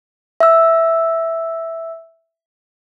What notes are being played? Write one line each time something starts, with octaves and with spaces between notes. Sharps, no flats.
E5 E6